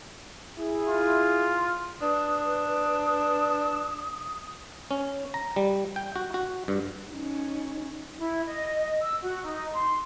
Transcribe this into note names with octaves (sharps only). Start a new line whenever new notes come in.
E4 G#4
F4
D4 B4 D#6
C#4
A#5
G3
G5
F#4
F#4
G2
C#4 D#4
E4
D#5
E6
F#4
D#4
C6